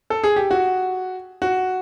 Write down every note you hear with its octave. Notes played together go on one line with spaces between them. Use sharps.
A4
G#4
G4
F#4
F#4